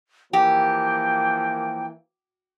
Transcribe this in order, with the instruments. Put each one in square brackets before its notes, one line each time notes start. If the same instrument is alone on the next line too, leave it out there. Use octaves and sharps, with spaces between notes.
[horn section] E3 F3 A#3 [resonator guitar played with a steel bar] G4 [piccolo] G5